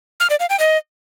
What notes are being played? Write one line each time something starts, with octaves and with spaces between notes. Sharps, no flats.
F6
D5
F5
G5
D#5